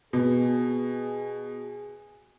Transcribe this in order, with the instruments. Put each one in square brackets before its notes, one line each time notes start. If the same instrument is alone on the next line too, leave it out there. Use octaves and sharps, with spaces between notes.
[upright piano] B2 [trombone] G#4